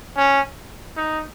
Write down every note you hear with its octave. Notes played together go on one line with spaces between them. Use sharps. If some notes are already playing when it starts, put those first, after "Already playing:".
C#4
D#4